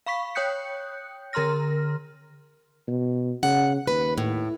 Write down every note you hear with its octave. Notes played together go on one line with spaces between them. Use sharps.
F5 B5 C#6 B6
C#5 G5 D#6 F#6 G6 C#7
D3 A#4 A#5 C6 F6 A#6
B2
C#3 F#5
D#2 B4
A2